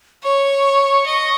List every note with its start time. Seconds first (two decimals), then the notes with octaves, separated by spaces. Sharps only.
0.23 C#5 C#6
1.06 D#5